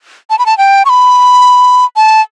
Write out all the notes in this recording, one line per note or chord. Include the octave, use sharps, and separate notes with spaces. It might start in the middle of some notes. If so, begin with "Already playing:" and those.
A5
B5
A5
G5
C#6
B5
A5